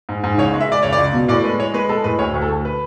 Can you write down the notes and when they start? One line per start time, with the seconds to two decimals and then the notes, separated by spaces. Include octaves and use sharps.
0.09 G#2
0.24 G#2
0.38 C#2 C#5
0.54 G#3
0.61 E5
0.68 G#3 D5
0.83 C#2 C#5
0.93 D5
0.98 C#2
1.13 B2
1.28 A2 D5
1.44 G#3 B4
1.59 G#3 C#5
1.74 G#3 B4
1.89 G#3 A4
2.04 A2 B4
2.19 D2 C#5
2.34 D2
2.42 A4
2.49 D2
2.65 B4